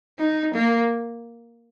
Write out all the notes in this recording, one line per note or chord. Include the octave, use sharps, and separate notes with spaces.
D#4
A#3